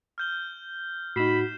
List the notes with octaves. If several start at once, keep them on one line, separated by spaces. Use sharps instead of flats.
F6 G6 G7
A2 D#4 F#4 B5 C7 E7